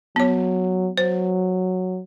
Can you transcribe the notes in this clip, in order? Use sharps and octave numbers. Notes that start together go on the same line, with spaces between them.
F#3 B3 C#5
F#3 C5